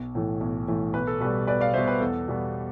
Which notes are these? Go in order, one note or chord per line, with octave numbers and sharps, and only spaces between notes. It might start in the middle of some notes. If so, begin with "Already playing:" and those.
Already playing: B1
A2 E3 A3
B1
A2 E3 A3
B1 B4
A4
B2 G3 B4
B1 B4 D5
D5 F5
B2 G3 C5 E5
B4
E2 A4
B2 G3 B3